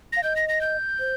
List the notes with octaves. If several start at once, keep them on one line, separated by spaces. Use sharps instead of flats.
F5 A#6
D#5 G6
A#6
A#6
G6
C5